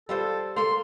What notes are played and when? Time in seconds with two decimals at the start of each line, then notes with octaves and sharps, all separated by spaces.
0.09 G3 F4 A4 C5
0.56 A#3 A4 C6